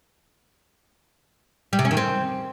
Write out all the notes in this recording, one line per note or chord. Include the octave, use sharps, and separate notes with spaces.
G3
C3
C#4
D#3
C4